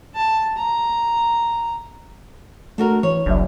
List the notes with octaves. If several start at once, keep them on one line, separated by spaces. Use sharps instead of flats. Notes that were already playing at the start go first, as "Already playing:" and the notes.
A5
A#5
A3 D4 F#4 A#4
E3 C#5
F#1 C2 F#3 D4 E5